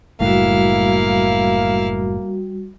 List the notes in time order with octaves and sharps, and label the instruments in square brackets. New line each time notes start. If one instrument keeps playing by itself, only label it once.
[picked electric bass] F#1 A2 [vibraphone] G3 F#4 [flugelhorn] A#3 [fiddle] E4 F5